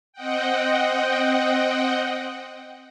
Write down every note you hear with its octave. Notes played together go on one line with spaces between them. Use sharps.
C4 D#5 F#5 G5